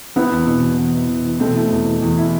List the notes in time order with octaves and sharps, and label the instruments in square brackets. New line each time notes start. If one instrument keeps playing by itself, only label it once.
[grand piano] B3 [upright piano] C4 E4
[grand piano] E2
B2
E2
B3
E4
B2
E2
[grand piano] B2 [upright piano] A3 C4
[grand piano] E4
E2
E2
E2
E4